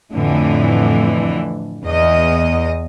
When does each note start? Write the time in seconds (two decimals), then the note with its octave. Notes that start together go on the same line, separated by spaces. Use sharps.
0.14 F2 A2 D3 E3
1.85 E2 D#5